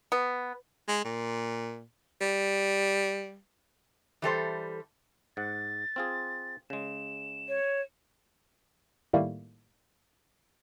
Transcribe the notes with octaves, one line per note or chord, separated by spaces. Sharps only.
B3
G#3
A#2
G3
E3 G3 A4 C5
G#2 F#5 A6
C4 F4 G#4
C#3 G#3 E7
C#5
A2 D#3 G3 A3 A#3